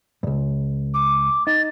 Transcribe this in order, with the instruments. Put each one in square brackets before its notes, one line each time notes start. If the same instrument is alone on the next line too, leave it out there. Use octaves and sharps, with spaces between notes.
[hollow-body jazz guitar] C#2 G2
[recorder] D6
[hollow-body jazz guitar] D#4 [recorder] A6